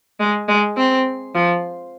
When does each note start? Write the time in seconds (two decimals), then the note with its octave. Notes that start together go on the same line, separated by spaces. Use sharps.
0.20 G#3
0.48 G#3
0.78 C4
1.35 F3